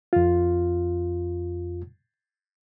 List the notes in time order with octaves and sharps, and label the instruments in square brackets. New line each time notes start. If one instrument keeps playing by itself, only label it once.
[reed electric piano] F2 F4